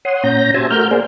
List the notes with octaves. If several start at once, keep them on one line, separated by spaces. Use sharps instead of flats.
C#5 F#5 C6 D#6
A#2 C#4 A#5 G6 A#6
F#4 G4 C5 E5 G#5 A5
A3 F#4 A#4 F6 G6
A#3 G#4 C5 D5